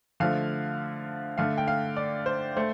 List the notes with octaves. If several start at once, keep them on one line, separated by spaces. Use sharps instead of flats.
D3 F3 A3 F5
D3 A3 F5
G5
F5
D5
C5
A3 C5